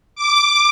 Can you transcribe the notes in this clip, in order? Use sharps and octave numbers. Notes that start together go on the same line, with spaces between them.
D6